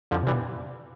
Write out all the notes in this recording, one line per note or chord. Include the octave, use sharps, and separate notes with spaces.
F2 D3 F3
C3 E3 G3
B2